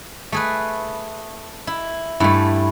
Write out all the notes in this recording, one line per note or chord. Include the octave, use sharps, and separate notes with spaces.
A3 G#4 B4
E4
G2 A3 E4 G#5